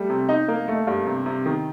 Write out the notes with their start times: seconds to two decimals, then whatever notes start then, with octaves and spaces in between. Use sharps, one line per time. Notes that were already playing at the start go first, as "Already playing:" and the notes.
Already playing: G3 A3
0.10 C3
0.29 D#4
0.48 A#3
0.68 A3
0.87 G2
1.06 C3
1.26 C3
1.46 D#3